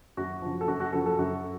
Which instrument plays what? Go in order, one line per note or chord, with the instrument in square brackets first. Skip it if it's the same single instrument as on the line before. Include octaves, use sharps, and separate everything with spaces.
[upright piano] F#2 F#4
C#3 F3
A4
F#2 F#4
F#4
C#3 F3 A4
A4
F#2 F#4